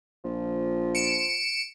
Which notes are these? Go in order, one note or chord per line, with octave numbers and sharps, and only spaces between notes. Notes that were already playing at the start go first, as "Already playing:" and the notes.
A#1 F3
C#7 D7 E7